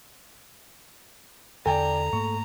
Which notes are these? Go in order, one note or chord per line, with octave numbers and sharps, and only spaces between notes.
E2 D3 A4 D5 G5 G#5 A#5
G#2 A3 A#3 C#6